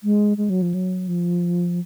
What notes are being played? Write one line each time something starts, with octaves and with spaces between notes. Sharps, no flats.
G#3
G#3
F#3
F3
F#3
F3